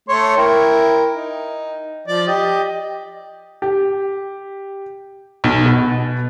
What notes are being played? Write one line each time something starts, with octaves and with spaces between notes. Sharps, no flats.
A3 C#5 C6
E4 A#4 G5
D#4
F3 D5
G4 D#5
G4
B1
B2